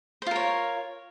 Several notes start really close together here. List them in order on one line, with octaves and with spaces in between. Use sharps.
C5 F4 A#4 C#5